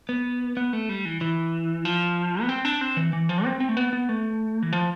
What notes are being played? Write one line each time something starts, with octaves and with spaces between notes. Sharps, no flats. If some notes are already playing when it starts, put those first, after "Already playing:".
B3
B3
A3
G3
E3
E3
F3
B3
C4
D4
C4
E3
E3
F3
C4
C4
A3
B3
B3
A3
E3
F3